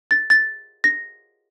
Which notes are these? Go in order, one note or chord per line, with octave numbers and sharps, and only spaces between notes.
A6
A6
A#6